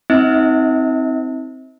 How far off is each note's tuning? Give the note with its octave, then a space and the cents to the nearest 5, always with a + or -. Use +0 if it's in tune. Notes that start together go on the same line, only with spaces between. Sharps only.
C4 +0 D#4 +30 E5 -40